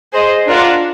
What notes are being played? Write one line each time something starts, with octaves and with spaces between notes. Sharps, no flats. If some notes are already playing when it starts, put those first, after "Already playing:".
G#4 C5 D#5
D4 F4 A#4 D5 F#5